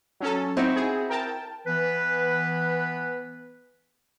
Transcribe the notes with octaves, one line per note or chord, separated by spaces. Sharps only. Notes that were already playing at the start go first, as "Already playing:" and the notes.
F#3 C#4 A4
C4 D#4 E4 F#4
G#4
A#4 G5 A5
E3 B3 B4